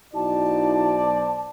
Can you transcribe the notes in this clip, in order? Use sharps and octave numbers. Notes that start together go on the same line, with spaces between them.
B1 D#4 E4 F#4 C5 D5 A5